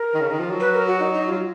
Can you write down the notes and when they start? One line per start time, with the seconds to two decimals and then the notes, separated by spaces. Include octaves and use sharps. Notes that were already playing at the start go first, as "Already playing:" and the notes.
Already playing: A#4
0.14 D#3
0.21 C#3
0.30 D#3
0.40 F3
0.51 F#3
0.60 B4
0.74 A#4
0.87 F#4
1.00 D#4
1.14 D#4
1.27 F4
1.32 F#3